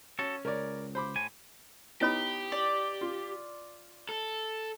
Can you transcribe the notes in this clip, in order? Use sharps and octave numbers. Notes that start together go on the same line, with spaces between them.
C#4 F#4 A4
C#2 A#4 C#5 D5
C5 B5 D6
A2 G#5
B3 D#4 E4 G4 C#5 B5
D5
F4
A4